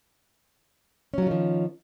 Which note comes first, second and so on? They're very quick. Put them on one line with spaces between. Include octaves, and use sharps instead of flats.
C#4 F#3 F4 D#3 F3